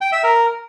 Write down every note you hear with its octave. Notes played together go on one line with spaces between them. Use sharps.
G5
E5
A#4